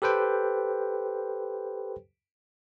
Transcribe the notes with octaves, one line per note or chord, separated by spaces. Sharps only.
G4 A4 B4 C5 G5